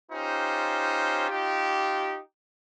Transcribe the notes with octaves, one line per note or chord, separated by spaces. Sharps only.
C#4 D#4 F4 G4 C5
D#4 F4 G4